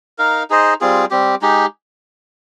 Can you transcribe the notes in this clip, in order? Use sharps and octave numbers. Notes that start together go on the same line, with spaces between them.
D#4 A#4 F5
D#4 G#4 C5 D#5
G3 C4 F4 G#4
G3 C4 G4
G#3 D#4 G4